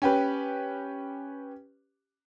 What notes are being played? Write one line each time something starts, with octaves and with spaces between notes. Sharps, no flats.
C#4 G4 B4